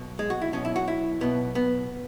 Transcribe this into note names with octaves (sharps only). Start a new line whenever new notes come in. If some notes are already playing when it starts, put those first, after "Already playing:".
Already playing: B1 B2
G#3
F#4
E4
B1 B2 C#4
E4
F#4
E4
B1 B2 B3
B3